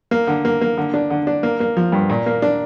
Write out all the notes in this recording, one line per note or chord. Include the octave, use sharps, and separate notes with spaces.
A#3
D3
A#3
A#3
D3
D4
D3
D4
A#3
A#3
F3
G2
A#2
A#3
D4